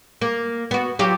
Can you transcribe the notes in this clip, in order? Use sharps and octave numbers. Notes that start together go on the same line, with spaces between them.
A#3
B3 F#4
F#3 F4 G4